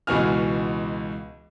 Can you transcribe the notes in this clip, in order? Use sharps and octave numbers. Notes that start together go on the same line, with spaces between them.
C#2 B2 E3 F#4 G#5 F6